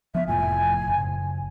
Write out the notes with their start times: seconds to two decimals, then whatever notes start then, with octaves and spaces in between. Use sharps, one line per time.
0.15 F3 B3 E5
0.28 F1 A2 F3 G#5
0.88 F#1